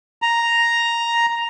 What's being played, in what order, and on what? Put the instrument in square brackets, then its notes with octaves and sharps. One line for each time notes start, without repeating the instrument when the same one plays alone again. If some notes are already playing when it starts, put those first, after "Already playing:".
[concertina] A#5